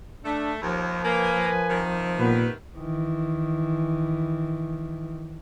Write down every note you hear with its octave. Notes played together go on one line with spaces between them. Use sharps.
A3 D4
D#2 F3
A#3 A#4 B4 G#5
C3 D#3
A#2 B3 B4
D#3 E3